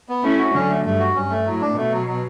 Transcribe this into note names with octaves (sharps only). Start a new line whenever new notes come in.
B3
A3 C#4 E4
F#4
D3 F#3 C#4
A3
G2 A3
F#4
G2 C#4
A3
A2 F#3
D4
B2 A3
F#3
F#3